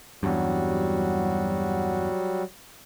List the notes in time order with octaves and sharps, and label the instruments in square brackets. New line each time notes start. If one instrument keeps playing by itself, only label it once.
[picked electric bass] E2 G2 [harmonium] F#3 G3 F#4